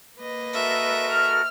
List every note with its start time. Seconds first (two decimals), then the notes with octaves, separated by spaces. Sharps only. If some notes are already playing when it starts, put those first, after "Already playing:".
0.18 A#3 B4 D#5
0.53 F#4 A4 A#4 E5
1.10 F6